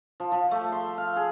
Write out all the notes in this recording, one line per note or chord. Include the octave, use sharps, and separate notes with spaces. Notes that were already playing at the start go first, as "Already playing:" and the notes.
F3
F3
A3
C6
F5
G#4